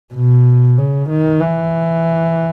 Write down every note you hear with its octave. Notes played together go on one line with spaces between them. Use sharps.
B2
C#3
D#3
E3